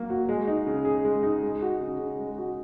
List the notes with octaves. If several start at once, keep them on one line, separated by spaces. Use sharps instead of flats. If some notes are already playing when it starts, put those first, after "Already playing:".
Already playing: F#3 A#3
F#4
G#3
D#4
C#3
G#4
G#3
D#4
G#3
F#4
C#3
C#3
G#3
F#4